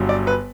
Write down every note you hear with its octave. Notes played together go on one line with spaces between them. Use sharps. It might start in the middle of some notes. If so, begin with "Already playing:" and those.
Already playing: G1 G2 D3 F#3
D5
B4